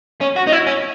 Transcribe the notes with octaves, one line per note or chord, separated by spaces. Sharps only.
C#4
F#4
D#4
E4
C#4